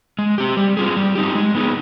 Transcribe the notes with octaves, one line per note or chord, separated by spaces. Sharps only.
G#3
C4 G4
G3
C4 F4 G#4
G3
C4 D#4 G4
G#3
B3 D#4 G#4